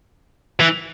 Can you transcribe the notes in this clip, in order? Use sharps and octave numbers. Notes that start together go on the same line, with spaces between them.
E3